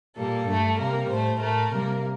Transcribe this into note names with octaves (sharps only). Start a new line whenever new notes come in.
A#2 G3 A#3 A4
G2 D3 A3
C3 G3 A#3 A#4
A2 A3 C5
A2 A3 A#4
C3 G3 A#3